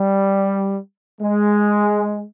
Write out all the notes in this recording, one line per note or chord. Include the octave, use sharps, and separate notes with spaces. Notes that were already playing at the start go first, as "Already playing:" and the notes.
Already playing: G3
G#3